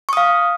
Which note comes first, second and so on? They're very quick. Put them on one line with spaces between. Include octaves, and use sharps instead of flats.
C#6 D#6 F5